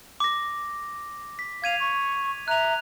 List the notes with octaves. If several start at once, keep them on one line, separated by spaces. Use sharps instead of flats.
D6 A#6
B6
F5 G#6 D#7 F7
C#6
E5 A#5 F#6 F7